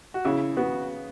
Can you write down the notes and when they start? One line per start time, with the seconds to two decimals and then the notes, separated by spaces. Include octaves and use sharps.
0.14 F#4
0.25 C#3 E4
0.57 B3 F#4